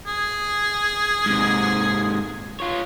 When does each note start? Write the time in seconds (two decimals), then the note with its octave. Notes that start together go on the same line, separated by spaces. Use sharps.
0.07 G#4
1.26 G#2 C3
2.60 F4 C#5